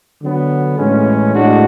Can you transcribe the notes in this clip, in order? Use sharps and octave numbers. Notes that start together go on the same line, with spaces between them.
D3 F#3 B3
A2 E3 G#3 C#4
A2 G#3 D4 F#4